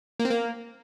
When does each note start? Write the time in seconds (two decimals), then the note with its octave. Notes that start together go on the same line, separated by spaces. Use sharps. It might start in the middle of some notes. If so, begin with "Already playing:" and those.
0.20 A#3
0.25 C4
0.30 A#3